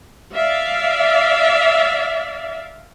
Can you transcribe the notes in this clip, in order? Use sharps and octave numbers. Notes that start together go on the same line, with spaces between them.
D5 E5 F5